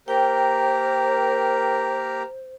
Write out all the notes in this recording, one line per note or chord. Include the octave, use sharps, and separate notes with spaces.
A#3 G4 A#4 C5 G5